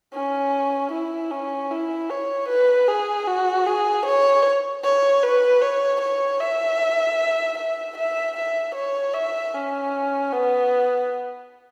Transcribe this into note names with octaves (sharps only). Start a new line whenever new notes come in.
C#4
E4
C#4
E4
C#5
B4
G#4
F#4
G#4
C#5
C#5
B4
C#5
C#5
E5
E5
E5
E5
C#5
E5
C#4
B3